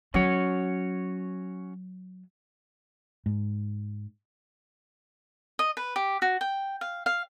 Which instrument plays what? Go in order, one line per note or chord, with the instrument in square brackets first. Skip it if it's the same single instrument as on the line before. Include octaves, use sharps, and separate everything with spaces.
[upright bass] F#3 [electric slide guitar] C#4 F#4 C#5
[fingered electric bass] G#2
[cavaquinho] D#5
B4
G4
F#4
G5
F5
F5